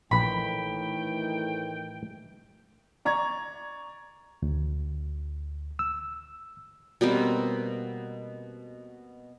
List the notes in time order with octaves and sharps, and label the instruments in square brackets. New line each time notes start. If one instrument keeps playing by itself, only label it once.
[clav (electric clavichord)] A#1 B4 [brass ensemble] A2 D#3 E3 [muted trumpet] G5 [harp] B5
[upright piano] D5 A#5 C#6 G#6
[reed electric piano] D2
E6
[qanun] B2 G3 A#3 C4